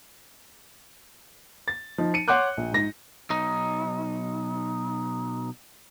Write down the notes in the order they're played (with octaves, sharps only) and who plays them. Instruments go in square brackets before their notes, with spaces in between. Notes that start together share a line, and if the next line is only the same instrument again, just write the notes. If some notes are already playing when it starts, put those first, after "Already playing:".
[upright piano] A6
F3 D#4
C#7 D#7
C#5 F#5 C6 D6 F#6 G6
A#1
G#2 A#6
[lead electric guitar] B1 D#4